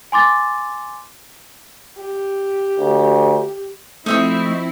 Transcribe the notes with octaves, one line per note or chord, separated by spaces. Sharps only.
G#5 C6 D6 A6
G4
D2
F3 A3 C4 D#4 E4 E5 C#6